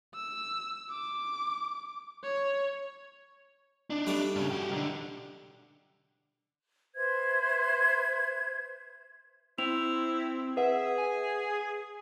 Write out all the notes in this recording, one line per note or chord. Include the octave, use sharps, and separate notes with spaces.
E6
D6
C#5
D4 D#4
G3 A3 D6
G2 C#3
F#4 G4
B1 D3
B4 C5 E5 G#6
C4 E4 F7
G#4 B4 E5 F#5
G#5